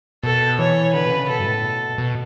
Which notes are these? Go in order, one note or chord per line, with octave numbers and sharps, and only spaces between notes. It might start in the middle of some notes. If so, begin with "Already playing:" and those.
B2 A4
E3 C#5
D3 B4
B2
C#3
B2 A4
G2
A2
B2
B2